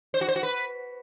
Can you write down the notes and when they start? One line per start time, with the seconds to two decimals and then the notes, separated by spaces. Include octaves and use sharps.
0.14 C5
0.21 F#4
0.28 C5
0.36 F#4
0.43 B4